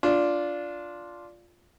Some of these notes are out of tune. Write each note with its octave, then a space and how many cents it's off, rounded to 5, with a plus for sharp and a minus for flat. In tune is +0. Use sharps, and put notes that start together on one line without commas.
D4 -10 F4 +0